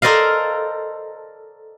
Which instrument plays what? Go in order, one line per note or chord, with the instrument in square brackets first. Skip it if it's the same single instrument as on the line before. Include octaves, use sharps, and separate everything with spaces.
[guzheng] A4 A#4 C5 D5 D#5 F5